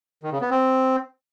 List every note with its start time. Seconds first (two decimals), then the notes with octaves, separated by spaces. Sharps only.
0.23 D#3
0.32 C#3
0.41 B3
0.50 C4